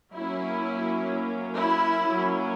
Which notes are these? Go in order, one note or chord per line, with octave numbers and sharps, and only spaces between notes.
F#3 A#3 C#4 E4
E4
F#3 A#3 C#4